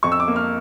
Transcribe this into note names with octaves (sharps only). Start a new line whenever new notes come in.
F2 C#6
E6
D6
A#3
F6